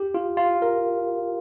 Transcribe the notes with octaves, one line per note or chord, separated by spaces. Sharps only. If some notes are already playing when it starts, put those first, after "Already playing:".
Already playing: G4
F4
F4
A#4